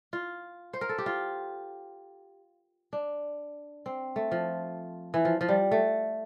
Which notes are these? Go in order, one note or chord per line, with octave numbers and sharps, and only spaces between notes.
F4
C5
A#4
A4
G4
F4
D4
C4
A3
F3
E3
F3
F3
G3
A3